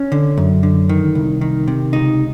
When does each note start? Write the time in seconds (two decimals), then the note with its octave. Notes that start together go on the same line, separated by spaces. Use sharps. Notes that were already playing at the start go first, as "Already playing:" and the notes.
Already playing: C#4
0.12 D3
0.37 F#2
0.63 D3
0.89 D#3
1.15 C2
1.41 D#3
1.68 C3
1.93 C#2 D#4